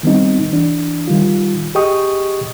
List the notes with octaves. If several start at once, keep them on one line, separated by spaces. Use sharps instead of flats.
D#3 G3 B3 C4 D#4
E3 D4
D#3 G3 F4
G4 G#4 D#5 G5 C#6 D#6